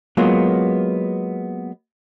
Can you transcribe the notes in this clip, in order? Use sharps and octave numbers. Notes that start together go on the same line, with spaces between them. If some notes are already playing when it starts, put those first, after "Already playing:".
F#3 G#3 A#3 B3 F4